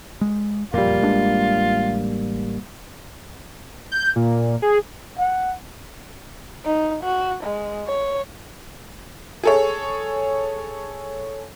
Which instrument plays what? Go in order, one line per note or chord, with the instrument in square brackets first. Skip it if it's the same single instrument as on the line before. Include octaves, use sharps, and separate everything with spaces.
[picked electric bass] G#3
[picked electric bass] F#1 F2 A#2 [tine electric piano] G3 A#3 [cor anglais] F4
[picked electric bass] A1 G#3 D4
[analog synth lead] G6
A#2
G#4
[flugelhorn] F#5
[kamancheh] D#4
F#4
G#3
C#5
[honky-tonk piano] G#4 A4 C#5